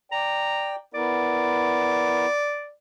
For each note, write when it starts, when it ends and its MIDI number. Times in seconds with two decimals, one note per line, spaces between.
0.12 0.76 74
0.12 0.76 79
0.12 0.78 82
0.94 2.26 59
0.94 2.26 64
0.94 2.26 70
0.94 2.73 74